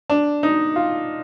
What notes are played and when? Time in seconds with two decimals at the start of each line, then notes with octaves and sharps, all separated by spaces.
0.10 D4
0.43 D#4
0.76 F4